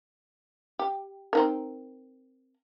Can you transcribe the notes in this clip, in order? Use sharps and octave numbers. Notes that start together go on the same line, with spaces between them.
G4
C4 D#4 A#4